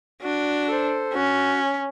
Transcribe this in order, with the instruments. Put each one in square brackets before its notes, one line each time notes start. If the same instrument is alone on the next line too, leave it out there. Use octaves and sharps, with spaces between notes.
[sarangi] D4 [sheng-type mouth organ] F#4
[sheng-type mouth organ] A4 C5
[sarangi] C#4 [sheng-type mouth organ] F#4